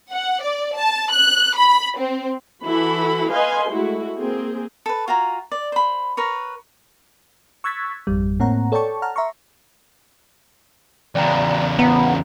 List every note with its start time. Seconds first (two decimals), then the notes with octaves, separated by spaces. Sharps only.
0.10 F#5
0.42 D5
0.76 A5
1.11 F#6
1.56 B5
1.97 C4
2.65 E3 E4 F#4 A4 B5
3.32 B4 D#5 F5 G#5 C6
3.70 G#3 A3 E4 F#4
4.20 A#3 C4 G#4
4.86 A4 B4
5.08 F4 F#4 G#5 A#5
5.52 D5
5.72 C5 B5
6.17 A#4 B4 C#5
7.64 C#6 E6 F#6 G#6 A6 B6
8.07 G#1 F2 G3
8.40 A2 A#3 C4 C#5 F#5 A#5
8.72 A4 C#5 D5 G5 A5 C#6
9.02 F#5 A5 A#5 F6
9.16 E5 A#5 C6 C#6
11.15 E2 C#3 D5 G5 A#5
11.79 B3 A#5